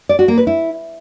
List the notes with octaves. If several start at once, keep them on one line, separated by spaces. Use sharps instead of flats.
D5
F#4
A#3
B4
E4